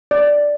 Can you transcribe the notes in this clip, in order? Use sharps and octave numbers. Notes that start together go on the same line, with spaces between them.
D5